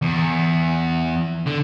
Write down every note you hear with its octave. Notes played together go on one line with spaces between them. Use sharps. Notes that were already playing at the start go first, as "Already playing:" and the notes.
E2
D3